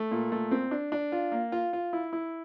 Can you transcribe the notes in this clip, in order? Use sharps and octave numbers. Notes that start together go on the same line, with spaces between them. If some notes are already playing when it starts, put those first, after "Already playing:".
Already playing: A3
A#2
A3
C4
D4
D4
F4
A#3
F4
F4
E4
E4